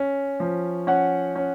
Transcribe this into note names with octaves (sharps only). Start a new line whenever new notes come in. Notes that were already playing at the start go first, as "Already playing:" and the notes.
Already playing: C#4
F3
C#4 F#5
C#4